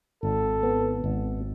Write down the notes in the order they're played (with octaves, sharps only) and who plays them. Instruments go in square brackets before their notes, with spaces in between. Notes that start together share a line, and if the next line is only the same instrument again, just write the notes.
[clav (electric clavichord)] G#1 [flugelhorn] A4
[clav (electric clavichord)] B3
G#1